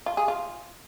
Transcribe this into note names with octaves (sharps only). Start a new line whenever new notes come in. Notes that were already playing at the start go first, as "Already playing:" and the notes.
F4
G#4
F4